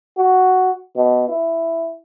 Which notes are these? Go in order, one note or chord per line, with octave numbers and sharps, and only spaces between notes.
F#4
B2
E4